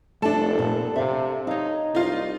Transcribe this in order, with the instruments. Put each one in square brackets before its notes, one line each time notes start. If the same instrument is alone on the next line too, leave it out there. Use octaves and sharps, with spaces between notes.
[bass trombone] F1 [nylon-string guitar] A3 A5 [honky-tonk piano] D4 A4
[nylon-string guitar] A#2
[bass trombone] C3 [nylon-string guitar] E5 F5
[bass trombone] D#4 [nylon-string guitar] C#5 F5
[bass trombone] C2 [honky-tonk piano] D#4 F4